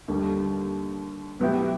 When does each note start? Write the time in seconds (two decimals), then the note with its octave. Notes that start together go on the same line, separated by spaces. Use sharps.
0.08 D#2 D3 G3
1.39 B2 F#3 B3 E4 G4